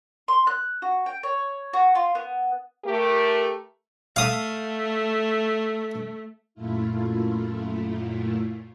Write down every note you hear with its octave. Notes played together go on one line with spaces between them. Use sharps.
C6
F#6
F#4
G5
C#5
F#4
F4
B3
A3 G4 A#4
A3 F5 D#6
F#2 A#2 A3 E4 F4